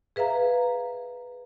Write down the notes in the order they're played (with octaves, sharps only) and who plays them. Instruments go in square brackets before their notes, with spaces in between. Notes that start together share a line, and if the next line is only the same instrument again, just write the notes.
[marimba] G#4 B4 E5 F5 A#5